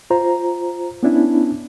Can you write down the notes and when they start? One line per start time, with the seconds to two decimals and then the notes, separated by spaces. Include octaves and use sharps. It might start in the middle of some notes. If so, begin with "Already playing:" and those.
0.10 F4 C5 A#5
1.03 B3 C#4 D4 E4